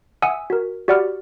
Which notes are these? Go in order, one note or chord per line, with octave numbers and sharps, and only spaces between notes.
E5 F#5 G#5 D#6 E6
F#4 A#4
F#4 G4 D5 F#5 B5 F6